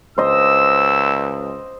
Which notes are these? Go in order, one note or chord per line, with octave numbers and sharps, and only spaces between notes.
C#2 C5 D#5 E6